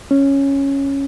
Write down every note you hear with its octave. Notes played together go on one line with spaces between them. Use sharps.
C#4